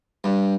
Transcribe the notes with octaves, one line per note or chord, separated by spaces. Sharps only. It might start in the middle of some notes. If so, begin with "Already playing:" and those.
G2